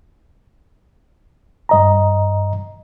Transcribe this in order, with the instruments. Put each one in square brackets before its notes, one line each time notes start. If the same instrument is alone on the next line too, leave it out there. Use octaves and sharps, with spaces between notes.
[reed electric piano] G2 D#5 A#5